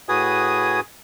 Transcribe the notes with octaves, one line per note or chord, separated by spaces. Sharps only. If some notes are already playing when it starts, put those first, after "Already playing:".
A2 F#4 G#4 B4 G#5 D#6